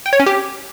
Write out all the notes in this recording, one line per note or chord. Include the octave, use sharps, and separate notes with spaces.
G5
C#5
C#4
G4